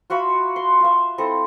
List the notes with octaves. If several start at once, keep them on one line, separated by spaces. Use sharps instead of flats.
F4 F#4 E5 B5
C6
F4 E5
C4 E4 A4 D#5